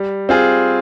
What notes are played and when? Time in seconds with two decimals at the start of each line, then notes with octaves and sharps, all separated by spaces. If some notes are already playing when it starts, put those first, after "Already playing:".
Already playing: G3
0.29 C4 F4 G#4